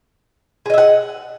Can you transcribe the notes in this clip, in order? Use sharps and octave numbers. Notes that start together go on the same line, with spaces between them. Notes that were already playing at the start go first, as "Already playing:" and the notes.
G#4 D#5 E5 F#5